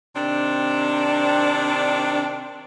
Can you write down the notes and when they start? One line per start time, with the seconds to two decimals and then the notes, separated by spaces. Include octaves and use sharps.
0.16 C3 D#3 C4 D4